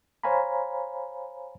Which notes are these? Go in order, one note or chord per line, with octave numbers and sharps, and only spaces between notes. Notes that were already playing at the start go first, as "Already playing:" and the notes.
C5 C#5 F5 G#5 A#5 B5